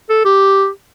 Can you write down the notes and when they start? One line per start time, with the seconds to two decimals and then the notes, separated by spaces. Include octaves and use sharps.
0.09 A4
0.25 G4